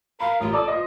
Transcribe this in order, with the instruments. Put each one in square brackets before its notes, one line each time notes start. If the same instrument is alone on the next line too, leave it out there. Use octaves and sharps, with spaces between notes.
[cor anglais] A#4 [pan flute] F5 [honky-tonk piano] B5
[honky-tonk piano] A1 [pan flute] F4
[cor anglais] A4 [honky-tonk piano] D5 D6 D#6
[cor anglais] F3 [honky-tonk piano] D#5 D#6